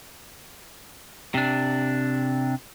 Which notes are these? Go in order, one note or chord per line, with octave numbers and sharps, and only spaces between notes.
C3 D4